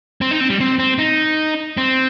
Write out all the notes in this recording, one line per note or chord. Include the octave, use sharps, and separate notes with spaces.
C4
D#4
C4
G3
C4
C4
D#4
C4